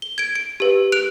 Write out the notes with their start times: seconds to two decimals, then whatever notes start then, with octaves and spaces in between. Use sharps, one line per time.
0.02 G7
0.18 G#6 D7
0.35 D7
0.60 G4 B4
0.92 F#6 D7 F7